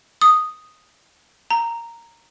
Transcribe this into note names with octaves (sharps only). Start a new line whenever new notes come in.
D#6
A#5